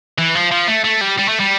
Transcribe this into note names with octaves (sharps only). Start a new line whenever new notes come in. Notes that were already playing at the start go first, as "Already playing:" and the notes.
E3
F3
F3
A3
A3
G3
G3
A3
G3